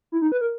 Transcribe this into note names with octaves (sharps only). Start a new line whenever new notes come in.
E4
D#4
B4
A#4